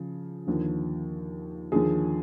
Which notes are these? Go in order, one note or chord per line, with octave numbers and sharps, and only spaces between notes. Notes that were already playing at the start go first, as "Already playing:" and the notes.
Already playing: C#3 F3
D#2 D3 F3
D#2 D3 F3 G#4